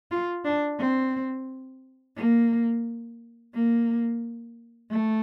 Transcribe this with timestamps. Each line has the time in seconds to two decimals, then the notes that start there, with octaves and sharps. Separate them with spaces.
0.11 F4
0.45 D4
0.79 C4
2.17 A#3
3.54 A#3
4.91 A3